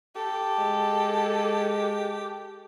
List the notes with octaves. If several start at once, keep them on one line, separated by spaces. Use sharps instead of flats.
G4 A4
G#3